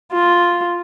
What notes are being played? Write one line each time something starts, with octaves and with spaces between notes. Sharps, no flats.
F4